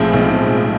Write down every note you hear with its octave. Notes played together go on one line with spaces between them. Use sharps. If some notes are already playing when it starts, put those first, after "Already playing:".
Already playing: B1 A2 F3 G#3 C4
B1